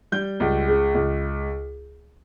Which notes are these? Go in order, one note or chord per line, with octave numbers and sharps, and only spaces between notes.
G3 G6
C#2
C#3
C#2